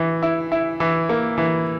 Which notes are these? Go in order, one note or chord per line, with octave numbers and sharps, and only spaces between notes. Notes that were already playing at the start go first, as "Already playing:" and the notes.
Already playing: E3
E4
E4
E3
A#3
E3